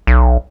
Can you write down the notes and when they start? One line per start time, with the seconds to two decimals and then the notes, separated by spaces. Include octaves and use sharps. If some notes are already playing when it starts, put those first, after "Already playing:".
0.07 B1